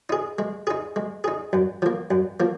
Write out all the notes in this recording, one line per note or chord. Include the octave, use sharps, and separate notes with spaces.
D#4 G#4
G#3
D#4 G#4
G#3
D#4 G#4
F#2
F3 A#3
F#2
F3 A#3